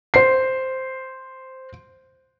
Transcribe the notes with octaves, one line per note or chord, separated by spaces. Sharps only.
C5 C7